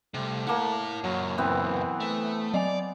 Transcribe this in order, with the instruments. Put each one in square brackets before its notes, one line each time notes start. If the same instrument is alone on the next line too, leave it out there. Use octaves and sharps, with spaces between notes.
[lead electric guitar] C3 G3 [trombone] A3
[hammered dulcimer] A#3 F#5 [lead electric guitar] E4 A5
[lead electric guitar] F#2 A#2 [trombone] F#3
[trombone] E3 [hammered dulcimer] B3 C4
[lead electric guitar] A3
[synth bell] F#3 D#5 G#5 [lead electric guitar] D5